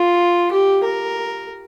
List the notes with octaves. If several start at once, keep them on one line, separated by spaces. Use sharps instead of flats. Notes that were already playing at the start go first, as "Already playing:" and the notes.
Already playing: F4
G4
A#4